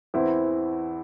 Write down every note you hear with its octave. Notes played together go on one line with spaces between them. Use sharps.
E2 E3 C4 E4